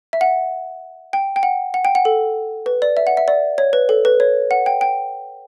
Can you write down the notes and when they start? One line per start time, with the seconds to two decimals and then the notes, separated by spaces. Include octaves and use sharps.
0.13 E5
0.21 F#5
1.13 G5
1.36 G5
1.43 F#5
1.74 F#5
1.85 G5
1.95 F#5
2.05 A4
2.66 B4
2.82 D5
2.97 E5
3.07 F#5
3.17 E5
3.28 D5
3.58 C#5
3.73 B4
3.89 A4
4.05 B4
4.20 C#5
4.51 F#5
4.66 G5
4.81 G5